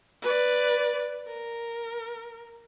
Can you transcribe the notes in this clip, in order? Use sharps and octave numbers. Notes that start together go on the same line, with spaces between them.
B4 D5
A#4